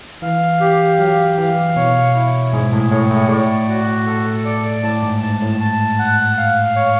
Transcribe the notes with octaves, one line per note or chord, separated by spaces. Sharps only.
E3 F5
G4
F#3 F5
E3 F5
B2 C#5
E4
G#2 G#4
A2
A2 C#5
A2
A2 D5
F#4
A4
D5
A2 A5
G#2
G#2 A5
A2
A5
F#5
F5
C#5